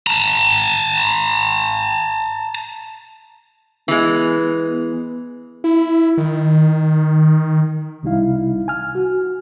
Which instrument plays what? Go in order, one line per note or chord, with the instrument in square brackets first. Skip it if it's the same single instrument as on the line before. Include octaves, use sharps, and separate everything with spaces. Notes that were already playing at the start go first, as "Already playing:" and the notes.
[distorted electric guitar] A5 A#5
[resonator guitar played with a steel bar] E3 G#3 [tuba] B3
[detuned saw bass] E4
D#3
[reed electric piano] C2 C3 G3 D#4 E4 F5
G#5 F6
F#4